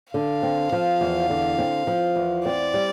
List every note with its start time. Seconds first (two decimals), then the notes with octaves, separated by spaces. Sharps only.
0.13 D3 F5
0.43 C4
0.72 F3
1.01 E2
1.30 D3
1.59 C4
1.87 F3
2.16 E2
2.45 C4 D5
2.74 G3